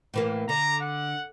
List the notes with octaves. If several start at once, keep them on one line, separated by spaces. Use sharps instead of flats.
A2 E3 A#3
D3 A#5
F#5